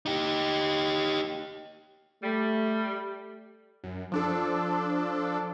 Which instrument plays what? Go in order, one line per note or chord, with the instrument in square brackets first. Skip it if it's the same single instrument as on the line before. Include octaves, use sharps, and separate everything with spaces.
[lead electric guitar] D#4 G4
[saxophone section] G3 [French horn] A3
[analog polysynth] F#2
F3 D4 A4